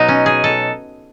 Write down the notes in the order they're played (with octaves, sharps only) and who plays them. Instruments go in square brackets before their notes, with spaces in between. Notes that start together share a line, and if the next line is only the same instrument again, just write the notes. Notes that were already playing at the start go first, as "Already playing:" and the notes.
Already playing: [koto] B2 F#3 D#4
C#4
G#4
A4